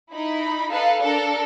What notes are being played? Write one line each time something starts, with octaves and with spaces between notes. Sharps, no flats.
D#4 E4 B5
D#4 A4 B4 F5 F#6
D4 A4 A#4